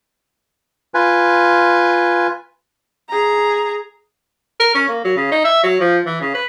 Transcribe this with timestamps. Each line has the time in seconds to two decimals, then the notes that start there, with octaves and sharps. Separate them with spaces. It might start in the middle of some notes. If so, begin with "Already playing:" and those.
0.94 F4 B4 G#5
3.10 G#4 A#5
4.60 A#4
4.75 C#4
4.89 A#3
5.05 F#3
5.17 C#3
5.32 D#4
5.45 E5
5.63 F#3
5.80 F3
6.06 E3
6.21 C#3
6.34 B4